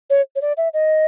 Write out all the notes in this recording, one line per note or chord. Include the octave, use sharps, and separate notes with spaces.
C#5
C#5
D5
E5
D#5